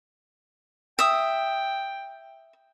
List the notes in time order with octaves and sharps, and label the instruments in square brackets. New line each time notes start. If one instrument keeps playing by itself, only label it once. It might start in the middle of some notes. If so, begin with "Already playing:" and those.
[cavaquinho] E5 D#6 [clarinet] G5